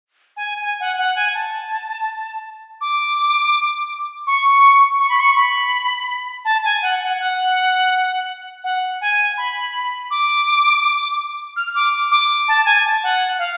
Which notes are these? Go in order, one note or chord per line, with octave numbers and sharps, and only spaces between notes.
G#5
G#5
F#5
F#5
G#5
A5
D6
C#6
C#6
B5
C#6
B5
A5
G#5
F#5
F#5
F#5
F#5
G#5
B5
D6
F6
D6
D6
A5
G#5
A5
F#5
F5